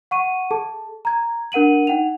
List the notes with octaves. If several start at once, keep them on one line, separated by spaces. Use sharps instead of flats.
F#5 C#6 D#7
G#4 A4 A5
A#5 G#6
D4 A#4 F#5 D#7 F#7
D#4 F#5 G5 F7